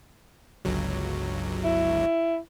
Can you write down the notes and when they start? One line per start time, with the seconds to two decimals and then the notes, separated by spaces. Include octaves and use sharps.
0.65 G1 C#2 F#3
1.64 E4